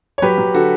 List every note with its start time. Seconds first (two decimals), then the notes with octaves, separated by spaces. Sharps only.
0.18 C#5
0.22 F#3 G4 B4
0.38 F#3
0.54 D3 F#4 A4